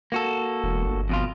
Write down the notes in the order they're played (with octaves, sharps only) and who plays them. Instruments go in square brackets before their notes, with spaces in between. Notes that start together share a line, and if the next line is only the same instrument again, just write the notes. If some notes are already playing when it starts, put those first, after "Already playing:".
[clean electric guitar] A#3 F#4 A4
[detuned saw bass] E1
G1
[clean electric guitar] F2 B2 F4